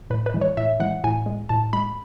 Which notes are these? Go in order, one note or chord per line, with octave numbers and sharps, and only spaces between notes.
A2 B4
B4
E3 G#3
C#5
A2 E5
E3 G#3 F#5
A2 G#5
G#3
A2 A5
G#3 B5